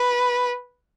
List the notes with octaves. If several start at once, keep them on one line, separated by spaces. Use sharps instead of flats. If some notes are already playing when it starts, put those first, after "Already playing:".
Already playing: B4